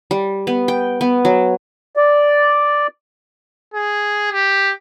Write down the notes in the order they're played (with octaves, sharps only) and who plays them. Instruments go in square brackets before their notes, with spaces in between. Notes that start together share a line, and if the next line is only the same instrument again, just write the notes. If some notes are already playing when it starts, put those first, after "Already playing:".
[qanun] G3
B3
G5
B3
F#3
[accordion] D5
[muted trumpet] G#4
G4